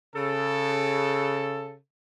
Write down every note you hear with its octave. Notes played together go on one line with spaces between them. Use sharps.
C#3 A4